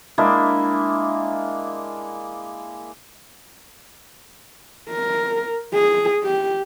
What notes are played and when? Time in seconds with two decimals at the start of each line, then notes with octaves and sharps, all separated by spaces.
0.18 G#3 A#3 D4 E4
4.90 A#4
5.74 G#4
6.24 G4